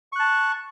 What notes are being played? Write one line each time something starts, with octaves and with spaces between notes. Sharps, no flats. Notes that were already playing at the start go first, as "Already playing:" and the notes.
A5 C#6 F#6